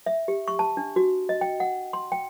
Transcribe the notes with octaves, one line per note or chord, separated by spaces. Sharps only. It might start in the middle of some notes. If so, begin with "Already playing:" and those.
E5
G4
C#6
A5
D4
F#4
D#5
G5
F#5
C6
G5